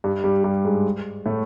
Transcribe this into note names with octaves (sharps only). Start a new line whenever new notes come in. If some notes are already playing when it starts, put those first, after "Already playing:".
G2 G3
G2 G3
G2 G3
G#2 G#3
A2 A3